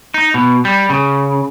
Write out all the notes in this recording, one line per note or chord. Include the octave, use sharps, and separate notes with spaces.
D#4
B2
G3
C#3